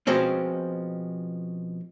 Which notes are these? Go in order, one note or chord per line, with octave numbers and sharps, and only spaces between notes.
B2 F3 G#3 C4 C#4